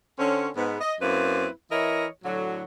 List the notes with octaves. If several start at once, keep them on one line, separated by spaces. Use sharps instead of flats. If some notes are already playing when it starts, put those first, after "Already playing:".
D3 C4 C#4
G#2 B3
D#5
F#2 A#3 C4 E4 B4
E3 E4 A#4 C#5 D#5
A2 D3 F#3